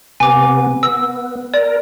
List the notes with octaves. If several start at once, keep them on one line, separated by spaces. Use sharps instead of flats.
C3 B3 G#5 D6
B3 E6
A#4 D5